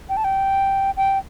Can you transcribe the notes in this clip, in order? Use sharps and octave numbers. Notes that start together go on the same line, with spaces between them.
G5
A5
G5
G5